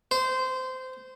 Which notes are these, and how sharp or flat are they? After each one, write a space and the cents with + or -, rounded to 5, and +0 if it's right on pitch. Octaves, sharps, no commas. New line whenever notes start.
C5 -20